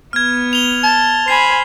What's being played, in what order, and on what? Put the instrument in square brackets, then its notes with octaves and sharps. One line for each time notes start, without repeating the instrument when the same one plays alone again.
[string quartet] B3 [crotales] F6 G#6
[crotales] F7 G7
[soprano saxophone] A5
[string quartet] C5 G#5 B5 [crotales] G#6 C7